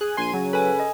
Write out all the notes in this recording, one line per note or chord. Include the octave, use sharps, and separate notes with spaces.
G#4 F#6
A#1 G#5 C6 G#6 D#7
C#3 F#3
A4 B4 G#5
D#5